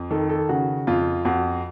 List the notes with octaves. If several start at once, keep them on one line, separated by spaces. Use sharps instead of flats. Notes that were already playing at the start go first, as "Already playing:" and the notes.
Already playing: F2
D#3 A4
A4
C#3 F#4
F2 F4
F2 F#4